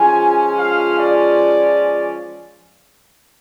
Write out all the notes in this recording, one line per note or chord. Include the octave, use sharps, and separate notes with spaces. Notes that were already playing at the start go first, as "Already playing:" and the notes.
Already playing: F3 G#3 C#4 F4 G#5
F5
D5